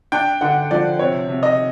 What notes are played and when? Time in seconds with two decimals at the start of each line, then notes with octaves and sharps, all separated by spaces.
0.12 D4 G5
0.41 D3 F#5
0.71 F3 D5
0.99 C3 C#5
1.29 C3
1.43 D#5